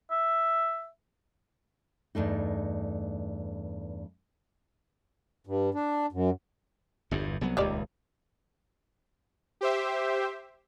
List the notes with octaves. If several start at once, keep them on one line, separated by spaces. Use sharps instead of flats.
E5
E2 G2 A3 D#4
G2
D4
F#2
G1 E2 G2
C2 F#3 B3
D#1 C#2 D#3 G4 D5
G4 C5 E5